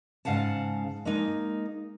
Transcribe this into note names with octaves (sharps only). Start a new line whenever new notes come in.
G#2 C#3 F5 F#5 A5
G#3 A#3 D#4